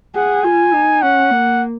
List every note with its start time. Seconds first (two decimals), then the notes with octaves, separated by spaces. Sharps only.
0.16 G#4 F#5
0.44 F4 G#5
0.73 D#4
1.02 C#4 F#5
1.31 A#3